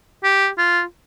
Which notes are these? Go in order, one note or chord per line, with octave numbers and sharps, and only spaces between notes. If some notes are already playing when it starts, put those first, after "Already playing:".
G4
F4